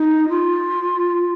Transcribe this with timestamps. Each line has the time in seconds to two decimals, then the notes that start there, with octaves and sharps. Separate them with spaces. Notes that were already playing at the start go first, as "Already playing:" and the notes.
Already playing: D#4
0.29 F4